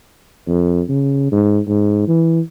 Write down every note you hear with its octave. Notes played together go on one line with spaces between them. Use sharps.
F2
C#3
G#2
G#2
E3